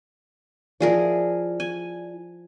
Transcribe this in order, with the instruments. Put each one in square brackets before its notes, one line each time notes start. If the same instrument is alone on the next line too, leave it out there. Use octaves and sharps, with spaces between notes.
[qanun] F3 G#4 A#4 [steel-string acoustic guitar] E4 D5
[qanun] G#5